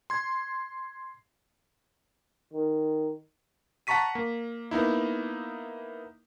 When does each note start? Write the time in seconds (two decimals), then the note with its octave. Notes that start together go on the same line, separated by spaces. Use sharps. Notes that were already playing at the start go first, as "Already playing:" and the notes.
0.10 C6 G#6
2.53 D#3
3.87 F#5 A5 A#5 C#6 B6 D#7
4.15 A#3
4.71 A#3 B3 D#4 E4